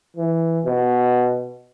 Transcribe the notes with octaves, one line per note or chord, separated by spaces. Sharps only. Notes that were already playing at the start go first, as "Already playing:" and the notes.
E3
B2